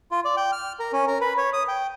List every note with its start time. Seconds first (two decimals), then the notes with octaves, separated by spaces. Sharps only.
0.11 F4
0.25 D5
0.37 G5
0.52 F6
0.80 A#4
0.93 C#4
1.08 A#4
1.21 B4
1.38 C#5
1.53 D#6
1.68 G5